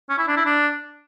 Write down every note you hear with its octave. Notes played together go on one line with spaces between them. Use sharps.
C#4
E4
D4
E4
D4